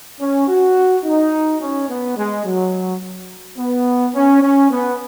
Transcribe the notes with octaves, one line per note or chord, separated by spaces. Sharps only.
C#4
F#4
D#4
C#4
B3
G#3
F#3
B3
C#4
C#4
B3